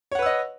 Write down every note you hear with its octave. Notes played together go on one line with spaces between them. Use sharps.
B4 C#5 D#5 F#5 E6